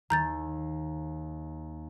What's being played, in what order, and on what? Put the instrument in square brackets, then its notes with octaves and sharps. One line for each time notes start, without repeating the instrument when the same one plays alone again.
[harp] D#2 [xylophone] A#5 G6 A6